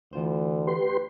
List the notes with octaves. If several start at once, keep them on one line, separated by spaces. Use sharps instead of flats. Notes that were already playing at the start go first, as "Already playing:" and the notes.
D2 E3 F4 C5
G4 B4 C6